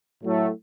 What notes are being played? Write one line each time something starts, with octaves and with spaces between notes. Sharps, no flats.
A2 F#3 A3